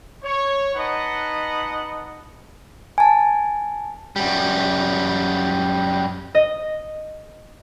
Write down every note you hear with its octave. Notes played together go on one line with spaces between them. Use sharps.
C#5
D#4 B4 D#5 F#5 A5
G#5 A5
F#2 G3
D#5